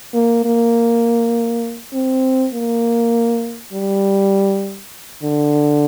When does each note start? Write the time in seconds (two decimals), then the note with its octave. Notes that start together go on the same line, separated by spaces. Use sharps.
0.14 A#3
0.44 A#3
1.93 C4
2.54 A#3
3.73 G3
5.23 D3